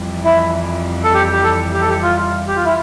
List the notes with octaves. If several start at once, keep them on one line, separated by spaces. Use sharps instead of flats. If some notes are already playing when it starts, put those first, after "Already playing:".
Already playing: F2 E3 G3
E4
A4
G4
G4
A4
G4
A4
G4
F4
G4
F4
E4